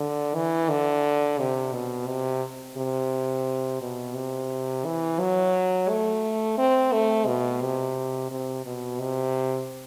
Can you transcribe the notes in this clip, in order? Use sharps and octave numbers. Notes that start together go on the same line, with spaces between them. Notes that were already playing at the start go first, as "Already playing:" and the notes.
Already playing: D3
E3
D3
C3
B2
C3
C3
B2
C3
E3
F#3
A3
C4
A3
B2
C3
C3
B2
C3